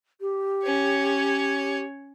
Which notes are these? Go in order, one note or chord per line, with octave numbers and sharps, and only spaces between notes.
G4
C#4 C#5